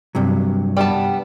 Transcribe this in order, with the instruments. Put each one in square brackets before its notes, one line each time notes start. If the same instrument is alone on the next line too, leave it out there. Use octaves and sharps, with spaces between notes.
[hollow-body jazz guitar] G2 C3 F#3
[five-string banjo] G3 B3 A5